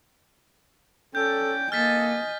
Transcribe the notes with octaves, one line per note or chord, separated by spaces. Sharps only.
C#4 A4 D5 G5 G6
A#3 A4 D#5 G#5 F6 A6 B6